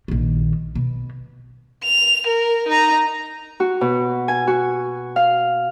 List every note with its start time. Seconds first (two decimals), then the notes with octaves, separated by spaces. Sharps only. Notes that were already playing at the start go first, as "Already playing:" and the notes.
0.08 A#1 D#3
0.75 B2
1.84 F7
2.27 A#4
2.68 D#4 A#5
3.60 F#4
3.81 B2
4.28 G#5
4.47 F#4
5.16 F5